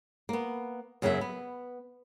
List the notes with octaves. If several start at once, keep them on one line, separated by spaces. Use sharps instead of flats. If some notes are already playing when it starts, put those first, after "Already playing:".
A#3 B3
F#2 C#3 F#3 A#3 E5
B3